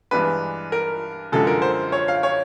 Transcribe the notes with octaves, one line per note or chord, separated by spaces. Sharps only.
G2 E3 G#3 B3 D4 B4
A#4
F#2 D3 F3 G#3 A4
A#4
C5
C#5
F5
C#5